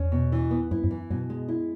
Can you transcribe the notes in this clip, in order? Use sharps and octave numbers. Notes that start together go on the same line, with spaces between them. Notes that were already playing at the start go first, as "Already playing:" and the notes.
Already playing: E2 C#4
B2
E3
B3
F#2 E4
F#2
E3
F#2 B2
G#3
E4